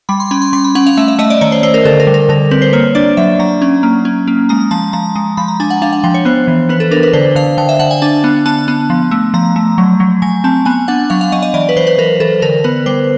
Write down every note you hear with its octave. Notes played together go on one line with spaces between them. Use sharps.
G3 B5
C6
C#4 B5
C6
G3 C6
B5
C#4 F#5
F5
A3 E5
E5
A3 D#5
D5
D#3 C#5
C5
A3 C5
A#4
D3 A4
A#4
G3
A#4
D3 A#4
C4 B4
C5
A#3 C#5
D4 D5
F#3 E5
F#3 A#5
C#4
A#3
C#4
A#3
G#3 A#5
F3 A5
F3 A#5
G#3
F3 B5
A#5
D4 G#5
F#5
D4 F5
F#5
F3 G5
C#5
B3 C5
E3
B3 B4
A4
D4 A#4
B4
D3 C5
D3 F5
D3 G5
E5
D3 F#5
G#5
D4 A5
B3
B3 A5
B3
F3
A3
F3 A#5
A3
F#3
F#3
F#3 G#5
C4 A5
B3 G#5
D4 F#5
F#3 F5
F5
F#3 D#5
D#5
E3 D5
B4
E3 C5
B4
E3 A#4
E3 A4
D3 A#4
B3 B4
G3 C5